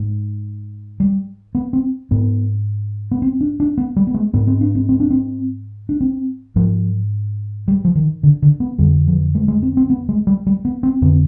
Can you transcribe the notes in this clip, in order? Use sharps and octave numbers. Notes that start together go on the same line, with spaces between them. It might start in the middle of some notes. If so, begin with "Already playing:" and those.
Already playing: G#2
G3
B3
C4
G#2 B3
B3
C4
D4
D4
B3
G3
B3
G#3
G#2 B3
C4
D4
C4
C4
D4
C4
D4
C4
G#2 F3
G3
F3
D#3
D3
D3
B3
F2 D3 G3
F3
G#3
G#3
C4
C4
B3
G#3
G3
G3
B3
C4
F2 D3 C4